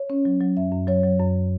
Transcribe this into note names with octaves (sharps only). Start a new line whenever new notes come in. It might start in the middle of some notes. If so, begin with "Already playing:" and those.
Already playing: C#5
C#4
F#3
F#3
F#2 E5
F#2
F#3 C#5
F#3
F#2